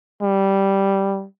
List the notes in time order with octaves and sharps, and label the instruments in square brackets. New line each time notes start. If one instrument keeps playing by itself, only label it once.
[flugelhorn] G3